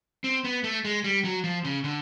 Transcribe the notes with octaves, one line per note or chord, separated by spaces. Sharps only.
C4
B3
A3
G#3
G3
F#3
F3
C#3
D3